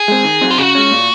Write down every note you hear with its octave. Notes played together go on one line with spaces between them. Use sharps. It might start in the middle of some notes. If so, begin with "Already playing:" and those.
Already playing: G#4
G#3 C4
D#3
F#3 C4 D#4
F4
C#3 F#4
G#3 C#4
A#2